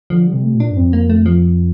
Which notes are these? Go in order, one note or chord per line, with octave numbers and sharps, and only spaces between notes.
D3 F3
G3
C3
A3
A#2
D4
G2
F2 C4
A#3
A3
F3